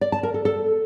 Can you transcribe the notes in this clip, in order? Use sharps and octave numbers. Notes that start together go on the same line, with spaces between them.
D5
A5
A#4
A4
A4